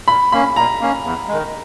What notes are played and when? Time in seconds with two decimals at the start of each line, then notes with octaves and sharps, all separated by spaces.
0.08 A#2 B5
0.32 A#3 C#4 B5
0.56 A#2 A#5
0.81 A#3 C#4
1.04 E2
1.28 D#3 G#3